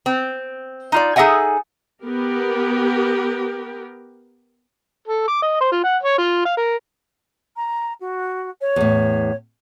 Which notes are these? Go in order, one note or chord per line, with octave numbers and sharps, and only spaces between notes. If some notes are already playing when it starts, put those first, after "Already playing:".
C4
D#4 F4 D5
D#4 G#4 A4 E5 F#5 G#5
B3 G4 A#4
A4
D6
D#5
C5
F4
F#5
C#5
F4
F5
A#4
A#5
F#4
C#5
E2 A2